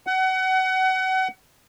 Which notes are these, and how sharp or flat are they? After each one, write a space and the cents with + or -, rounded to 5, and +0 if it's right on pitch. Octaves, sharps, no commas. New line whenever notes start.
F#5 +30